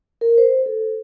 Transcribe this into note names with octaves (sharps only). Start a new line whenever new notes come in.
A#4
C5
A4